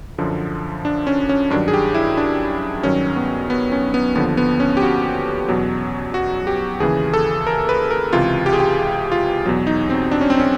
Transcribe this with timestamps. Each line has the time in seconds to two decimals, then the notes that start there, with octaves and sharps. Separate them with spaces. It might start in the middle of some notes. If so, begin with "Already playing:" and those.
0.18 F#2 D3 F3
0.85 D4
1.07 C#4
1.29 C#4
1.50 G2 D#3 F#3 D4
1.68 G#4
1.74 G4
1.94 E4
2.17 D4
2.83 G2 D#3 F#3 C#4
3.16 B3
3.50 B3
3.72 C#4
3.94 B3
4.15 D#2 D3 F3 B3
4.37 B3
4.60 C#4
4.77 G4
4.82 F#4
5.49 E2 B2 F#3
6.14 F#4
6.47 G4
6.80 D#2 C#3 E3 G#4
7.14 A4
7.47 A#4
7.69 B4
7.91 A#4
8.13 C#2 C3 E3 F4
8.46 G4
8.53 G#4
8.60 G4
9.12 F4
9.46 E2 B2 F#3
9.67 D#4
9.90 C4
10.11 D4
10.21 C#4
10.30 C4
10.40 C#4